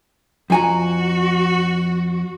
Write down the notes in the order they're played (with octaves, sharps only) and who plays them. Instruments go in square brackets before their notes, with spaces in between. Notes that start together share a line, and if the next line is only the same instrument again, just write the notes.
[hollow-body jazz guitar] F2 G#5 A#5 [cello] F#4